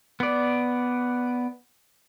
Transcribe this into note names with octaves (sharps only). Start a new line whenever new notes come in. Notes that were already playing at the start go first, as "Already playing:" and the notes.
B3 D5